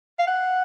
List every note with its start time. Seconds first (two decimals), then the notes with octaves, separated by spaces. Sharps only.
0.19 F5
0.27 F#5